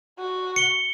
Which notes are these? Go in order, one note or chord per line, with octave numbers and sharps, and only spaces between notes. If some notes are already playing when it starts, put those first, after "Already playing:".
F#4
C#7 G7